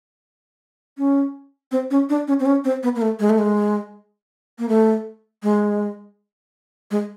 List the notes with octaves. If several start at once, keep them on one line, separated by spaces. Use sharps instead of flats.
C#4
C4
C#4
D4
C#4
C4
C#4
C4
B3
A#3
A3
G#3
A3
G#3
A#3
A3
G#3
G#3